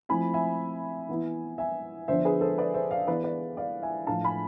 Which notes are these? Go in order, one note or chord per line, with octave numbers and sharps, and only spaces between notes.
F3 A3 C4 E4 G#5 B5
E5 G#5
E3 B3 E4
E5 G#5
D3 F3 B3 D4 C5 E5
G#4 B4
A4 C5
B4 D5
C5 E5
D5 F5
E3 B3 E4 B4 D5
B4 D5
D5 F5
E5 G#5
A2 F3 A3 D4 F5 A5
G#5 B5